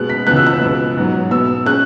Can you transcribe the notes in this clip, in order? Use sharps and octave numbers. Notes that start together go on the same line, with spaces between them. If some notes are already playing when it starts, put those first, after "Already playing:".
Already playing: B2 G#3 B3 F#6
B6
C#2 C#3 E3 B3 F#6
E6
F#6
C#2 B2 B3
G#2 F#3 B3
B2 B3 E6
G#3 C#4 F#6